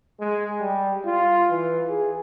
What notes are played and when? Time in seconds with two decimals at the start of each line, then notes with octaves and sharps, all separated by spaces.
0.19 G#3
0.60 G3
1.06 F4
1.50 E3
1.89 G#4